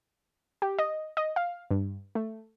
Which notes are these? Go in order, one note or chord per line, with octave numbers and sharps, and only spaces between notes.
G4
D#5
D#5
F5
G2
A3